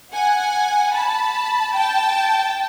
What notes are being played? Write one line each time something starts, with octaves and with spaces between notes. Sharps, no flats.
F#5 G#5
A5 B5
G5 A5